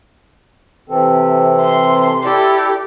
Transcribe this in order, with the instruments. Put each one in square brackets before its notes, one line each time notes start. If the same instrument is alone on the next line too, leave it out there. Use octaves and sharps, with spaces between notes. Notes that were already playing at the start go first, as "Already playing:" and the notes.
[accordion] C3 [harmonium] E3 C4 A4
[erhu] C6
[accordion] E4 A4 D5 [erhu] G4